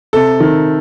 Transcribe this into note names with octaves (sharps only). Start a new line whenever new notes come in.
C3 A4
D#3